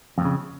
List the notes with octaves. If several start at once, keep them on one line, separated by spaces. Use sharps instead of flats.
F2 A#2 C#3